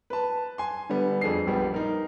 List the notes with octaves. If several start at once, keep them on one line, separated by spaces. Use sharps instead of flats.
B4 A5
G#5 C6
D3 G3 B3
F2 G#4 A4 C7
A#1 G3 B3
D#4 A#4